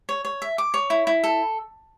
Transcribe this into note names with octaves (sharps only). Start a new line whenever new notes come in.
C#5
C#5
E5
D6
C#5
E4
E4
A4